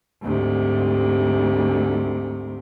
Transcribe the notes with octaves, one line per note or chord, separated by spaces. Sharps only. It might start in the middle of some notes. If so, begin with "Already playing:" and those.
D2 G#2 C3